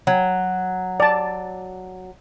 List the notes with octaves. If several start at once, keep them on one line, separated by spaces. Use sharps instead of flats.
F#3
D5 A5